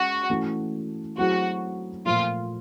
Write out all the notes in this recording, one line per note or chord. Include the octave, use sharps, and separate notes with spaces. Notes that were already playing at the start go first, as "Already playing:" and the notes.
Already playing: G#3 C#4 F#4
E3 A3 C#4 F#4
F#3 A3 C4 E4 F#4 G#4
A#2 F3 A3 F4